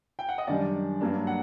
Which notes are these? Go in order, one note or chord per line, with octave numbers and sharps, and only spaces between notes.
G5
F#5
D#5
F#2 D#3 G3 D4 D5
G2 F#3 A#3 D4
F#5